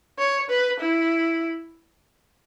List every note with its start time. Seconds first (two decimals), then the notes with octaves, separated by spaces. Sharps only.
0.19 C#5
0.50 B4
0.80 E4